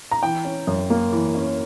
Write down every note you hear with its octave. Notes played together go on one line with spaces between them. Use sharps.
A#5
E3 G5
C#4
F#2
A#3
E3
C#4